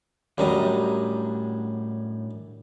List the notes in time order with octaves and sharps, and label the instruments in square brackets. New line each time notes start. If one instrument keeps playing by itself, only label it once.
[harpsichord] F#2 G3 D#5 [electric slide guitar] A2 D4 A#5